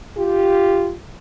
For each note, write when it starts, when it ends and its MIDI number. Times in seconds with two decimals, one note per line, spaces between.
0.18 0.93 65
0.18 0.93 67